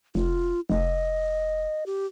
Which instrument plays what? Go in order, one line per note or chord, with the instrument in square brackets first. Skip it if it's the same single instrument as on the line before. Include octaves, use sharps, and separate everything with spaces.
[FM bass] F1 [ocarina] F4
[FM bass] F1 [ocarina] D#5
[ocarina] G4